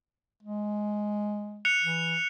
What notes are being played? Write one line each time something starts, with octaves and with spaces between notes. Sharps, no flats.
G#3
F#6 C#7 F7
E3